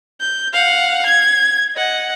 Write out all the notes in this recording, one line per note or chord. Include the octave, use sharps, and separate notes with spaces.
G6
F5 F#5
G#6
D#5 F#5